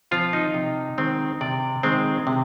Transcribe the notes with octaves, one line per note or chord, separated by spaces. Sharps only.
F3 C4 F4
D#4
C3
D#3 G#3 C4
C3 D5
D#3 G#3 C4
C3